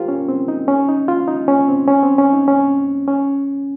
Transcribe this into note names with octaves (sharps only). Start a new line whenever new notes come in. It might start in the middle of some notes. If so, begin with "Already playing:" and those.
Already playing: F4 G4 A#4 C5
C#4
C4
D#4
C#4
D#4
F4
D#4
C#4
C4
C#4
C4
C#4
D#4
C#4
C#4